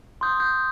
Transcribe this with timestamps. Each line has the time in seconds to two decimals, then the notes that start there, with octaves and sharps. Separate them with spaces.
0.21 C6 D#6 G6
0.40 G6